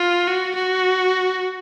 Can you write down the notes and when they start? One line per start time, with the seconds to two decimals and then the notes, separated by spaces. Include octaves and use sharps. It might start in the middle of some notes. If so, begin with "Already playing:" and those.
Already playing: F4
0.28 F#4
0.55 F#4